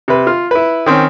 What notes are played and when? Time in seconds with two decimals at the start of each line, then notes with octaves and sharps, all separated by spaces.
0.08 C3 B4
0.27 F4
0.51 E4 B4
0.86 D#3 C4 C#4